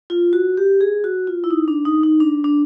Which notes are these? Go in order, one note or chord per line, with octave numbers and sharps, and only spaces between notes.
F4
F#4
G4
G#4
F#4
F4
E4
D#4
D4
D#4
D#4
D4
D4